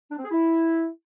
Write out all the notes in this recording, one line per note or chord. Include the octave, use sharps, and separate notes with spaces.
D4
C4
G#4
E4